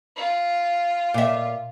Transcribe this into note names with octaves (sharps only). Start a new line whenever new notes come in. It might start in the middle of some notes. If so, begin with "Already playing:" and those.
F4
A#2 E5